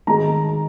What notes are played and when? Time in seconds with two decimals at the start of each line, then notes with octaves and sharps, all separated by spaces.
0.07 G#2 D#3 G#3 A#5